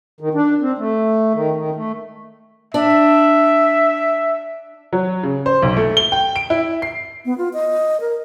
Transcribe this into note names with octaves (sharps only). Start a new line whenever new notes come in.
D#3
D4
C4
A3
D#3
D#3
A3
D4 E5
F#3
C#3
C5
B1
A3
G7
G5
D7
E4
C7
B3
F4
D#5
A#4